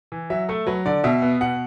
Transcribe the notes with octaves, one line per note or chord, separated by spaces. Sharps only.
E3
F#3 E5
A3 A4
F#3 B4
D3 D5
B2 E5
B3
B2 F#5